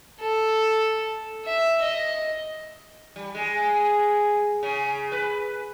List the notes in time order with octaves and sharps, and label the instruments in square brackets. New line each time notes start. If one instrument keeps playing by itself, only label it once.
[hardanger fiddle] A4
E5
D#5
[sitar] G3
G#3
C#3
B4